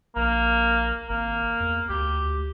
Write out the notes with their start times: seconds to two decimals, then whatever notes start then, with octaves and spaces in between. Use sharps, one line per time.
0.16 A#1 A#3
1.09 G#1 A#3
1.60 E2
1.90 D2 G4